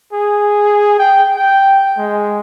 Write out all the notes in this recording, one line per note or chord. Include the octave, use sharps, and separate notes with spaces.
G#4
G5
G5
G#3